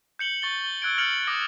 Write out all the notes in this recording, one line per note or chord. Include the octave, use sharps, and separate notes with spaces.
G6 C#7 F#7 G7
C#6 A6 G7
G7
E6 F#6 G#6 D7
F6 G6 A6 C#7 F7 F#7
D6 D#6 F#6 G6 A#6 G7